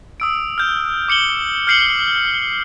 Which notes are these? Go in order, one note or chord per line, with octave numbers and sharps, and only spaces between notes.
D#6 E6 D7
F6 G6
D6 C#7 F#7 G7
F6 G6 C7 C#7 F#7 G7